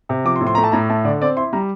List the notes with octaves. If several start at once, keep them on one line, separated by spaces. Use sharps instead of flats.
C3
F3 D6
C6
A2
C6
A3 A#5
A5
A2 A#5
A3 A5
D3 D5
C4 D5
E4 C6
G3 A#5